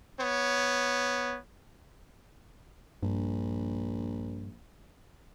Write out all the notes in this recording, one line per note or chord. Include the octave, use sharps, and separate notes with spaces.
B3 C#5
A#1 G2